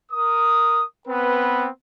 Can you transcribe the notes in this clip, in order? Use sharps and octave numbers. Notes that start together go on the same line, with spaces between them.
A#4 D#6
B3 C4 B4